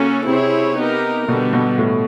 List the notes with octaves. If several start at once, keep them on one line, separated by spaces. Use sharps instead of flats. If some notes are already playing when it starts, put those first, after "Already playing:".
Already playing: C#3 A#3 C#4 F#4 A4
C3 C4 E4 G#4 C#5
B3 D#4 G4 A#4
B2 D3 G3 B3
B2
A2